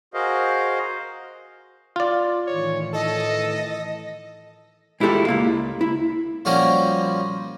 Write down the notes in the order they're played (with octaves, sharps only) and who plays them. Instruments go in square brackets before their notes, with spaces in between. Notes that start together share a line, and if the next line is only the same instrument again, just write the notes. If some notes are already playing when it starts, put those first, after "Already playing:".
[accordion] F#4 G#4 A#4 C5 D#5 F5
[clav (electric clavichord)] F4 D5
[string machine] A2 D#3 E3 [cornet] C#5
[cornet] A4 [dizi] D#5
[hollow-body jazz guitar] G#3 E4 F4 G4 A4
C#2 A#3 F5
E4
[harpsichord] A#2 F3 G3 C#4 F#4 A#4